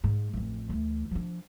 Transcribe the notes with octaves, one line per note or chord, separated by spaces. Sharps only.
G#2
A1 F2
D2 E3
F3 D4